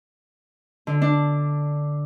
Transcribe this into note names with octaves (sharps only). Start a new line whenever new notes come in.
D3
D4